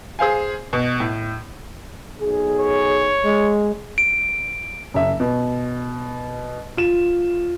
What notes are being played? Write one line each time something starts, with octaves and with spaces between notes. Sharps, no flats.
G#4 C5 F5 G#5
B2
A2
B1 G#4
C#5
G#3
D7
F#1 E5
B2
F4 E7